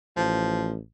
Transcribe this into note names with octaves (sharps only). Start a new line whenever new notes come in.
A1 F3